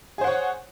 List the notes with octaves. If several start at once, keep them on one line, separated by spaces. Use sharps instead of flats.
G#4 C5 C#5 F#5